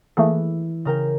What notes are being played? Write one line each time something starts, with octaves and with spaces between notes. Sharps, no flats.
E3 A3 A#3 G#4
C#3 A#4 G5